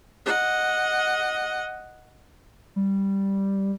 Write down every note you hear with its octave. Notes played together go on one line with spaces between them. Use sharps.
D#5 F#5
G3